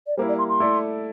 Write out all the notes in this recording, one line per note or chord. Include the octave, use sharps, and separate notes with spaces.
D5
G3 A#3 E4 C5
D5
C6
C6
A3 E4 A4 D5